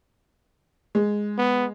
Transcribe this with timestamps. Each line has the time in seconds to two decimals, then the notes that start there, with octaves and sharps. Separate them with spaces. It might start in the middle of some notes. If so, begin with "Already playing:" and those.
0.95 G#3
1.38 B3